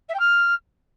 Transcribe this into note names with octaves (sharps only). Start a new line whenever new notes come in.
E5
G5
F6